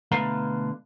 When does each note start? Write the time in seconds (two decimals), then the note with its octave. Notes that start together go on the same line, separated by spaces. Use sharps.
0.11 B2 D3 A3 B4 F5 A#5